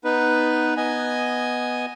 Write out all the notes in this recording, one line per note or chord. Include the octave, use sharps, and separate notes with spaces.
B3 D#4 B4
B3 D#5 G#5